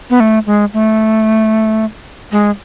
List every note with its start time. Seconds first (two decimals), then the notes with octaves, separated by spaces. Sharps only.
0.10 B3
0.20 A3
0.46 G#3
0.74 A3
2.32 G#3